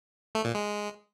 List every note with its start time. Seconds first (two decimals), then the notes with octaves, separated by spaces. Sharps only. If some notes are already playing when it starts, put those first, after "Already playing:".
0.35 A3
0.45 A#2
0.55 G#3